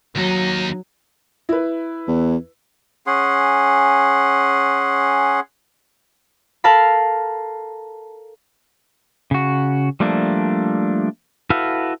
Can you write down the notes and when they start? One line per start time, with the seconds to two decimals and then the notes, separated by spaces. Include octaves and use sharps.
0.15 D#2 F#3 D#4
1.49 E4 B4
2.08 E2
3.07 C#4 G#4 F#5 C6
6.64 A4 A#4 F5 A5 B5
9.31 C#3 F#4
10.00 F3 G3 A3 A#3 D4
11.50 E4 F#4 A4 B4 F5